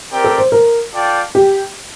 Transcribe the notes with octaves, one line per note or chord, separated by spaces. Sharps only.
C4 G4 A#4 D5 G5
A4
C5
A#4
F4 A4 D5 G5
G4